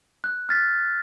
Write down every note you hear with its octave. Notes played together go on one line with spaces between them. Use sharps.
F#6
F6 A6 B6